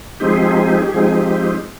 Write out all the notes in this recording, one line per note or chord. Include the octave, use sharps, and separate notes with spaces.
F3 G#3 C4 D#4 G4
G#4
G4
G#4
G4
G#4
G4
G#4
G4
G#4
F3 G#3 C4 D#4 G4
G#4
G4